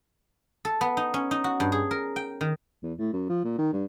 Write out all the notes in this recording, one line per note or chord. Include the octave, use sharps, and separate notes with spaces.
A4
B3
D#4
C#4
D#4
F#4
G2
G#4
A#4
G5
D#3
E2
A2
F#2
F3
A#2
D#3
G2